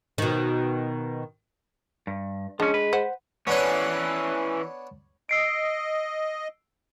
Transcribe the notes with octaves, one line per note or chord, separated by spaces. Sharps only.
B2 D#3
G2
F3 G#3 C#4 D4
B4
C5 F#5
E3 B3 C#4 D4 C#5
D#5 E6 C7 D7